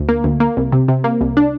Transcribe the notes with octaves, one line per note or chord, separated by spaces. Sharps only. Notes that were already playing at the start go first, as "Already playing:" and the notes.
Already playing: D2
A#3
D2
A#3
C2
C3
C3
A#3
C2
D4